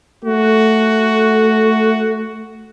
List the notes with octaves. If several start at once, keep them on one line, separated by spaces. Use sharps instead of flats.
A3 F#4